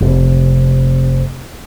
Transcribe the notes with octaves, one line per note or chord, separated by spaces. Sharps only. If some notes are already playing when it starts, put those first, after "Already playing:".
F1 C3